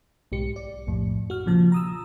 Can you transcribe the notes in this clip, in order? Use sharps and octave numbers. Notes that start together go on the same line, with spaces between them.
B1 G#2 G4 C#7
D5
B1 F2 A2
F#4 F6
A#2 C#3 F3 A5
A#5 D#6 E6